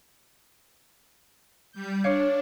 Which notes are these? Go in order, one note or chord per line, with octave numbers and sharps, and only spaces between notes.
G3 G6
D4 C#5 F5 D6